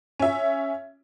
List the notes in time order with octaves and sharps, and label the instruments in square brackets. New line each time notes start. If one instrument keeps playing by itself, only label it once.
[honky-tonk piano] C#4 E5